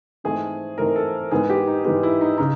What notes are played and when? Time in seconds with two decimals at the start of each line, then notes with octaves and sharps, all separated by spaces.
0.24 G#2 E3 A3 C4 D#4 G#4
0.78 G#2 E3 A3 C4 D#4 A#4
0.96 A4
1.31 G#2 E3 G#3 B3 G#4
1.50 G4
1.67 D#4
1.84 G#2 E3 G#3 B3 G4
2.03 E4
2.21 D#4
2.38 C#3 D#4